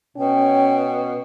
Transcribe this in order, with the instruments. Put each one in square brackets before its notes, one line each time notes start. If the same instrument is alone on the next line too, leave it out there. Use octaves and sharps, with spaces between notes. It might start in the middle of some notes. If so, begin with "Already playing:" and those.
[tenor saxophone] B2 [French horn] C#4 [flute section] G5